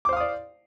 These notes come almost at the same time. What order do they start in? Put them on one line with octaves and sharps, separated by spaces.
D6 C5 F5 D#6 D5